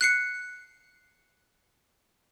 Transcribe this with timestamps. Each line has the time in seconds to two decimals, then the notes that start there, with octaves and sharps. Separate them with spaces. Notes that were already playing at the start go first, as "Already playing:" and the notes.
0.01 F#6 C7 C#7